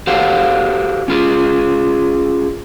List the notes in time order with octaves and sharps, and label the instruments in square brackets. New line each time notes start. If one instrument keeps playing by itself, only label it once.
[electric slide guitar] F#4 G4 A4 C5 F5 F#5
C#4 F4 G#4